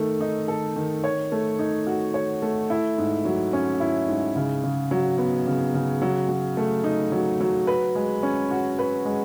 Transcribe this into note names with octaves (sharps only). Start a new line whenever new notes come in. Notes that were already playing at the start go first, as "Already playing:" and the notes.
Already playing: D#3 A3 A4
D#4
A4
D#3
C#5
A3
D#4
F#4
C#5
A3
E4
G#2
F#3
C#4
E4
G#2
C#3
C#3
F#3
B3
C#3
C#3
F#3
F#3
A3
D#4
F#3
F#3
B4
G#3
C#4
F#4
B4
G#3